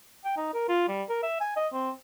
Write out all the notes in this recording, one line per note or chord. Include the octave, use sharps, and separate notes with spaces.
G5
D#4
A#4
F4
G3
A#4
E5
G#5
D#5
C4